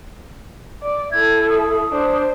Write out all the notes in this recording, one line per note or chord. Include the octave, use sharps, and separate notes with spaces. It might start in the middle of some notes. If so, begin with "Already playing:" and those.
D5
E4 A4 G#6
D#6
D4 C5